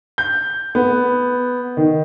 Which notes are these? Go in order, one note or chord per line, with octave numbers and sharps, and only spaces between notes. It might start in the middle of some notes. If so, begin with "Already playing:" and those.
G6
B3
D#3